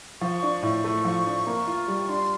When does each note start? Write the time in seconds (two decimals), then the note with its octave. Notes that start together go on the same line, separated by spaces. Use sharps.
0.21 F3 C#6
0.43 D4
0.63 A2
0.84 A3
1.05 F3
1.26 D4
1.47 A#3
1.67 F4
1.88 G3
2.09 D4 C6